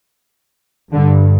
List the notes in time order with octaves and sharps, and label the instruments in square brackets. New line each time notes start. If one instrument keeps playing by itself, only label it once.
[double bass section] G2 D3